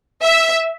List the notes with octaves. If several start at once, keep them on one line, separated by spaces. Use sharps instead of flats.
E5